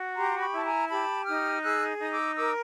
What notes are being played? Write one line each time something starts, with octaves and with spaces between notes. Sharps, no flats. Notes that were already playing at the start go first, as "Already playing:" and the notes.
Already playing: F#4
G4 A#5 C6
B5 C#6
E4 A5
G#5 A#5
G4 A5 B5
D#4 D#6 F6
G#4 E6 F#6
D#4 D#6
D6 E6
A#4 D6 E6